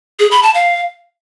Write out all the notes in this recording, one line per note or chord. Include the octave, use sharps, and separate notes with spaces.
G#4
B5
A5
F5